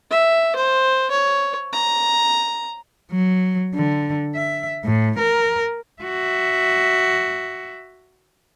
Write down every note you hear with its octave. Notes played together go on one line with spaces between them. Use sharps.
E5
C5
C#5
A#5
F#3
D3
E5
A2
A#4
F#4 E5